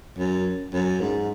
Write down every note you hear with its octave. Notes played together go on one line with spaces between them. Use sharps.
F#2
F#2
G#2